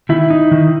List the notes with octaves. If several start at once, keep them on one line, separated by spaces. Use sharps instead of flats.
D#3 E4
D#4
D#3